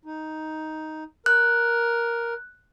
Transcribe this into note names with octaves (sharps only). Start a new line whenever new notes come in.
D#4
A#4 F#6